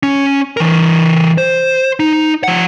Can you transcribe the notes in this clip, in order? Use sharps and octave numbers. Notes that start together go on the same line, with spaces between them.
C#4
E3 A#4
C5
D#4
F3 F#5